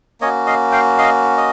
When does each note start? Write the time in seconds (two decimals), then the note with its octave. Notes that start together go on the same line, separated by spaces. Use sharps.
0.21 A#3 C#4 F#4 C#5 D#5
0.47 D#5 F5
0.72 F5 G5
0.98 D#5 F5
1.37 D#5